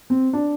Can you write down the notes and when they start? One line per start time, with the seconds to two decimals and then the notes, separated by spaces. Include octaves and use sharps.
0.10 C4
0.33 D4